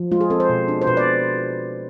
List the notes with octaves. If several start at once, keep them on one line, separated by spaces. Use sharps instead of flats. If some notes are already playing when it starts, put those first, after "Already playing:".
Already playing: F3
G#3 F4
G#4
C4 A4
C5
B2
D4
C5
B2 B4
D5